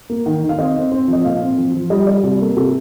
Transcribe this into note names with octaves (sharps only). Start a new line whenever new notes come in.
A#3
D#3
D#3
F5
C4 D#5
C4
C4
F3
D#5
A#2 F5
C4
F3
F3
G3 D#5
G3 D5
C3 G4
A#3 A4
C3 A4